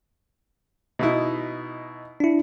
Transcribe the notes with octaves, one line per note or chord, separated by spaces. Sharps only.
B2 D#4 E4
D4 E4